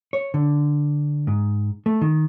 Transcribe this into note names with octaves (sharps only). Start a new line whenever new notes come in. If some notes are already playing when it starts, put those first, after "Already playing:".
C#5
D3
G#2
A3
D#3